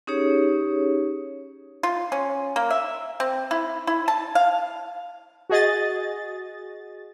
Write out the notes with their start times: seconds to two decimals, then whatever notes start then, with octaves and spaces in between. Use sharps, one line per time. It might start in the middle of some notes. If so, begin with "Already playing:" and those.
0.07 C#4 D#4 G4 G#4 C#5
1.83 F4
2.12 C#4
2.56 A#3
2.71 E5
3.20 C4
3.51 E4
3.87 E4
4.08 A5
4.35 F5
5.50 F#4 G#4 D#5 A6